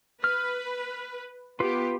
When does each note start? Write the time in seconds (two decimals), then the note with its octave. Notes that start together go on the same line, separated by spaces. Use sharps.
0.24 B4 F6
1.60 B3 F4 G4 B4